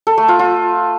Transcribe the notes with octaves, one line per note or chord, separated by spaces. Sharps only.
A4
A3
F4
F4